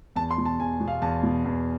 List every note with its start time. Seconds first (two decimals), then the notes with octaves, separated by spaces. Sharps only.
0.16 E2 A5
0.31 C6
0.38 B2
0.45 A5
0.59 E2 G#5
0.80 B2
0.88 F5
1.02 E2 A5
1.23 B2
1.45 E2